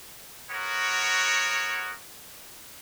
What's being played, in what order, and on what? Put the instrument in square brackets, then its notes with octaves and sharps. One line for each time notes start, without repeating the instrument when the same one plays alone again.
[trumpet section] B3 F#4 A#4 C#5